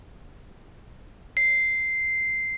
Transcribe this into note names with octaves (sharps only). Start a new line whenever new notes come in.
C7